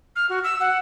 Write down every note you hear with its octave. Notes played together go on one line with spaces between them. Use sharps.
F6
F#4
E6
F#5